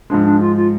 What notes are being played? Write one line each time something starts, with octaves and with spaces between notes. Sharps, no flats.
G#2 F3 G#3 D4
D4
F4
F4